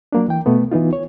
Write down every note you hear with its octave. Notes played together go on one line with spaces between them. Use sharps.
F#3 A#3 D4
E3 G5
B2 A3 B3
E3 B3 D#4 F4
C#5